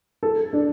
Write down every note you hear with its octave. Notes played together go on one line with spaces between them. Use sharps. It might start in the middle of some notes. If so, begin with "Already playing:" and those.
A4
D4